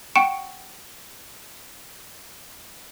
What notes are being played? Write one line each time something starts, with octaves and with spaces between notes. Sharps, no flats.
F#5 G5 C#6 C#7 D7 E7